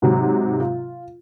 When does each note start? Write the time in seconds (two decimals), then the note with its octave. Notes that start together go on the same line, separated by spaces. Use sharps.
0.02 G#2 C3 F#3
0.60 F4